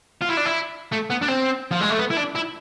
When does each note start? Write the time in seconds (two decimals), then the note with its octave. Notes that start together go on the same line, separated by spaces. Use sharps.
0.21 F4
0.29 E4
0.37 D4
0.46 E4
0.92 A3
1.10 B3
1.22 D4
1.28 C4
1.72 F3
1.81 G#3
1.90 A3
1.99 B3
2.10 E4
2.17 D4
2.35 E4